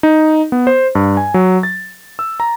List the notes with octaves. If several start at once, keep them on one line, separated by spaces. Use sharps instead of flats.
D#4
B3
C5
G2
G#5
F#3
A6
E6
A#5